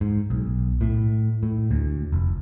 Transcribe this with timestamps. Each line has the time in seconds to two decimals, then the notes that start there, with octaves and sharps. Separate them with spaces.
0.01 G#2
0.30 B1
0.81 A2
1.43 A2
1.71 D2
2.12 F1